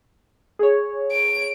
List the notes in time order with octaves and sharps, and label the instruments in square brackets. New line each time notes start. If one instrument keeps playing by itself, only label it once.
[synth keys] G#4 C#5
[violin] D7